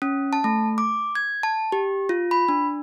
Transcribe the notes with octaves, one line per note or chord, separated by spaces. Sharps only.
C#4
A5
A3
D6
G#6
A5
G4
F4
B5
D4